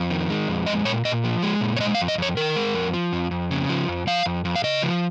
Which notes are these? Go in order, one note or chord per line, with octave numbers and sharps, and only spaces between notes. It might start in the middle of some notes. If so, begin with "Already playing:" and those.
Already playing: F2
D#3
G#3
F2
G#3 D#5
A#2 C#5
A#2 D#5
F3
G#3
A#2
C#5
G#3 D#5
F5
F2
D#5
F2 C#5
D#3 A#4
G#3
F2
F3
F2
F2
C#3
F3
F2
F3 F5
F2
F2
F5
C#3 D#5
F3